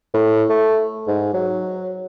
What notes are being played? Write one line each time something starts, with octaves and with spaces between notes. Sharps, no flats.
A2
A3
G#2
F#3